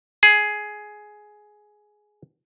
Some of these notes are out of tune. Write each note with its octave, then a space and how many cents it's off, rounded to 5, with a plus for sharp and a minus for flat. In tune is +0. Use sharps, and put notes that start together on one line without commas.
G#4 +10